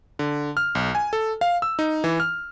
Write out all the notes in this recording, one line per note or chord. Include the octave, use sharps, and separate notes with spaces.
D3
F6
B1
G#5
A4
F5
E6
D#4
E3
F6